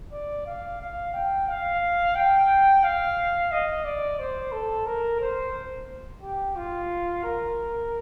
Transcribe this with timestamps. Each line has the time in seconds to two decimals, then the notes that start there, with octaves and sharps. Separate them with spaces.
0.12 D5
0.46 F5
0.81 F5
1.14 G5
1.48 F5
2.15 G5
2.84 F5
3.52 D#5
3.85 D5
4.19 C5
4.52 A4
4.86 A#4
5.21 C5
6.22 G4
6.56 F4
7.23 A#4